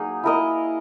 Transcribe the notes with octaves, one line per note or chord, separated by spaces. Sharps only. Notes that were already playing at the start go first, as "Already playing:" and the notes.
Already playing: F#3 A#3 D#4 G#4
E4 A#4 D#5